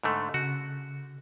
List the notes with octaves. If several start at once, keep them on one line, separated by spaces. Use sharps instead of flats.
G#2 D3 A3
C#3 F#4